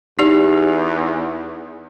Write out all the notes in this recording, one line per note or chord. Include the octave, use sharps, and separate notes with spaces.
E2 D#4 G4 D5